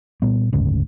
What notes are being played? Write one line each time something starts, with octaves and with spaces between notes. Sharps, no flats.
A#2 G3 B3
F#1 D2 G#2 C#3